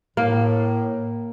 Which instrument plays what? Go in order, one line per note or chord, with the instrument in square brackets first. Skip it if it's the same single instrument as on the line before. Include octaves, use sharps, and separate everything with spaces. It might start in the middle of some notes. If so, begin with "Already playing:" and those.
[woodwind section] A2 [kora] A#3